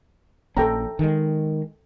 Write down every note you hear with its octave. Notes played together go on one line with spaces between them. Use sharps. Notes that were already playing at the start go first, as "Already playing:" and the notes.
A#1 C#4 A4 G5 A#5
D#3 G#3